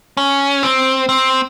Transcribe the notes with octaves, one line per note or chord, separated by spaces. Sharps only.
C#4
C4
C4